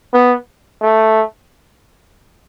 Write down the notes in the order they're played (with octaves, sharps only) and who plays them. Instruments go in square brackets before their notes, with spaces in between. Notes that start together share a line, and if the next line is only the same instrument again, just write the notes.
[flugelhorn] B3
A3